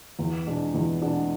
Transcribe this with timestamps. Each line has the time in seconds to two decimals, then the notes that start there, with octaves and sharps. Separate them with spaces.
0.19 E2
0.46 B2 G#3 B3 D4
0.74 E2
1.02 B2 G#3 B3 D4